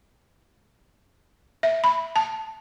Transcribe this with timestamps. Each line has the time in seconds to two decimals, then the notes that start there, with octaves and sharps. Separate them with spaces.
1.63 E5
1.84 B5
2.16 A5